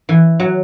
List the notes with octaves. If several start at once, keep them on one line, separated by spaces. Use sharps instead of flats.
E3
F#3